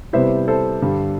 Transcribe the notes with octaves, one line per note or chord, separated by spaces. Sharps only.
C3 G3 B3 E4 C5 E5
A4 C5
G2 D3 G3